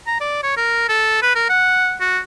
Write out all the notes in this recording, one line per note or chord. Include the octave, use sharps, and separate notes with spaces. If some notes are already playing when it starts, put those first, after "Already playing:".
A#5
D5
C#5
A#4
A4
B4
A#4
F#5
F#4